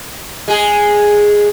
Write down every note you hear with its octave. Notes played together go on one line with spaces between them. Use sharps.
G#3 G#4